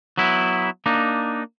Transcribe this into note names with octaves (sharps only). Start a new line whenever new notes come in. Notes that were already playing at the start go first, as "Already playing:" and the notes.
F#3 B3 E4
A#3 D4 D#4